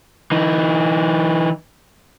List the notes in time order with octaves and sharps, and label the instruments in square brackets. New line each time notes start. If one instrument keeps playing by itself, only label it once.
[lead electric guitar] E3 D#4